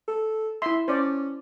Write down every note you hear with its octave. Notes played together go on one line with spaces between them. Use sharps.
A4
E4 E5 C6
C#4 C5 D5